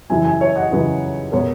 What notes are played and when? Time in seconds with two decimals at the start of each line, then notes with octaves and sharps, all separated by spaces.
0.10 F#2 C#3 E3 E5 G#5
0.25 E5 G#5
0.40 C#5 E5
0.56 D#5 F#5
0.71 F#2 C#3 E3 B4 D#5
1.32 B2 G#3 B3 A#4 C#5